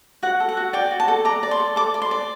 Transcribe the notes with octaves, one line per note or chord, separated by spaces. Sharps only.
F#4 F#5
A4
F#5
F#4
D5 G5
F#4
A5
A4
D5 A#5
D5
C6
A4
A4 D6
D5
C6
D5